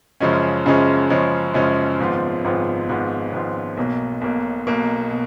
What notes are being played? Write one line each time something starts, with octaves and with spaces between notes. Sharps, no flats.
F#2 C#3 F3 G#3 C#4
F#2 C#3 F3 G#3 C#4
F#2 C#3 F3 G#3 C#4
F#2 C#3 F3 G#3 C#4
G#1 G#2 F3 B3 F4
G#1 G#2 F3 B3 F4
G#1 G#2 F3 B3 F4
G#1 G#2 F3 B3 F4
B1 B2 A#3
B1 B2 A#3
B1 B2 A#3
B2